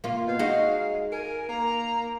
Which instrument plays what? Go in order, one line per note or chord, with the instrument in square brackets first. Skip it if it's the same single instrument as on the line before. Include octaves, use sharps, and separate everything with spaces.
[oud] A#3 F4
[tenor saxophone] B2 [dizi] F5
[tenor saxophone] G#3 [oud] D#4 F#4
[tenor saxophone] A#4 [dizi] G#5
[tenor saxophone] A#3 [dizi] A#5